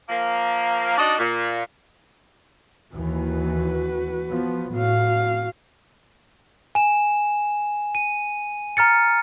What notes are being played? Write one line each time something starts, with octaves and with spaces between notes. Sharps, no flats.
F3 A#3
D4 D#4 F#4 D5 D#5
A#2
D#2 E3 F#4 B4
F3 B3
A2 F#4 F5
G#5 E7
D#7
A#5 F6 A6 C#7